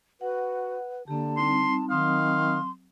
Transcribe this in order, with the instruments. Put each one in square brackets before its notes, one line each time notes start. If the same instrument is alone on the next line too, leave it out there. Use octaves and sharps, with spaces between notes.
[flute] F#4 [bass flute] B4 [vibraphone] F#5
[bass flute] D3 [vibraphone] A#3 G4 [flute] A5
[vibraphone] G3 C4 D#4 [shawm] C6
[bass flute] D#3 [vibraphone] F#3 C4 D#6 [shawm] F5 [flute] C6